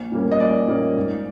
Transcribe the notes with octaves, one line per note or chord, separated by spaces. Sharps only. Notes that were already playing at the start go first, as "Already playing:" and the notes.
Already playing: A#1
A#2 G3 A#3 C#4
D#5
A#1 D5
A#2 G3 A#3 C#4
G#2